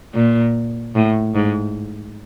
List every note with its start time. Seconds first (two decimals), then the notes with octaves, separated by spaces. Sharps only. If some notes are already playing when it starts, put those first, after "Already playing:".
0.14 A#2
0.95 A2
1.35 G#2